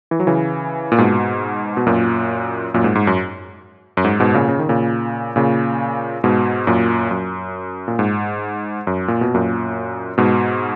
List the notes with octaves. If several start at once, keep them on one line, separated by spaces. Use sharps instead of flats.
E3
F#3
C#3 E3
A#2
G#2 B2
B2
F#2 A#2
F#2 A#2
G#2
G#2
F#2
F#2
G#2
G#2 B2
A#2 C#3
C#3
D#3
A#2 C#3
A#2 C#3
G#2 B2
F#2 A#2
F#2
A#2
G#2
F#2
A#2
B2
F#2 A#2
G#2 B2